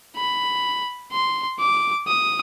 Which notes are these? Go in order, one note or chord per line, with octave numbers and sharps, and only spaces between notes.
B5
C6
D6
D#6